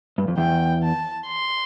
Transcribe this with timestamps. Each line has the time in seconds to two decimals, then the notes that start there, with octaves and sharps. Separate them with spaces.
0.18 G2
0.28 F2
0.38 E2 G5
0.83 A5
1.27 C6